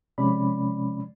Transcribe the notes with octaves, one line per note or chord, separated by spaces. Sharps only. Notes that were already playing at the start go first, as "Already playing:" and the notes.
C3 F3 G#3 C#4 D5 B5